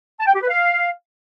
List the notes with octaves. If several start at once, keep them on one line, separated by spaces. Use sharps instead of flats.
A5
G5
G4
B4
F5